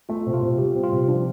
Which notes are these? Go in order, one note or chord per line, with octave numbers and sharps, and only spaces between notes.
A3 F4
C3
F4
C3
G3 G4
C4
F4
C3
F3 D4